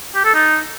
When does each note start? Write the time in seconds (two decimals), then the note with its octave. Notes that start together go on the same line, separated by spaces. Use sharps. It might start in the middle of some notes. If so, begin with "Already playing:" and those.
0.15 G4
0.24 A4
0.34 D#4